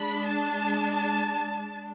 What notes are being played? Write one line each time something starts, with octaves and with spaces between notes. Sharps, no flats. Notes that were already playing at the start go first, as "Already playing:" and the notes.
Already playing: G#3 D4 B5
A5